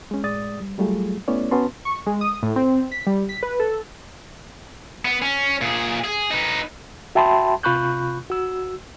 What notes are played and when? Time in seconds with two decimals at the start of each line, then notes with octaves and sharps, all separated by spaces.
0.11 G#3 C#4
0.23 A2 G#3 D5 D#6 A6
0.60 G3
0.78 F#3 G3 A3 F4 G#4
1.28 A3 B3 C#4 E4 C#5 D5
1.51 B3 C#4 F#4 B4 A5 C6
1.85 C#6
2.06 G#3
2.21 D#6
2.43 A2
2.56 C4
2.92 B6
3.07 G3
3.29 B6
3.43 B4
3.60 A4
5.05 B3
5.22 C#4
5.61 A#2 G#4
6.04 G#4
6.31 D#4 B4
7.15 F#4 E5 G5 A5 B5 C6
7.63 C3 F4 B5 C#6 F#6 G6
8.30 F#4 E6